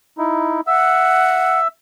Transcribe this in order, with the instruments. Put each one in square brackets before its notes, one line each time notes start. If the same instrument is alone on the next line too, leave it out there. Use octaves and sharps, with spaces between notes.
[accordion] D#4 E4
[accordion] E5 E6 [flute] F#5